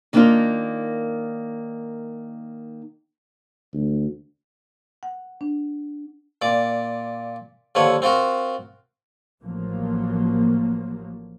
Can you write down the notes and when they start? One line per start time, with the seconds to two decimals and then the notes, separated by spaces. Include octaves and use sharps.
0.13 D#3 A#3 B3 D4 D#4 F4
3.73 D2
5.03 F#5
5.41 D4
6.42 A#2 D5 D6
7.75 D#2 D3 F3 B4 C#5 F#5
8.02 C4 F4 F#4 A#4
9.42 A1 F3 F#3 A#3